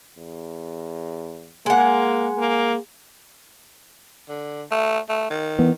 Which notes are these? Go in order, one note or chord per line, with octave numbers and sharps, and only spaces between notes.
E2
G#3 A#3 F#5
A#3
D3
A3
A3
D#3
E3 B3